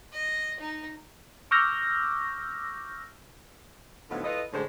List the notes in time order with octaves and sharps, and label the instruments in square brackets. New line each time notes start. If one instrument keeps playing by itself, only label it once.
[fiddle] D#5
D#4
[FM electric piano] C#6 D6 E6 F6 G6 A#6
[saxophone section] A2 D3 F3 F#3 B3 D#4
E4 F4 A4 B4 D#5
F#2 A2 D3 G#3 C5 C#5